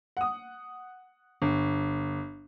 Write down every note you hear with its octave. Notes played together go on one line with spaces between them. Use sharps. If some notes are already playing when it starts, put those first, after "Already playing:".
F#5 D#6
G1